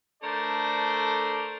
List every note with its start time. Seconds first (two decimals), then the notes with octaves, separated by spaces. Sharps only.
0.23 A3 D4 A4 A#4 C5 D5